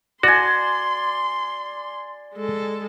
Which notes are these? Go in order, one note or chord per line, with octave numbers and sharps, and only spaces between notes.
F#4 D5 G#5 C6
G#3 A4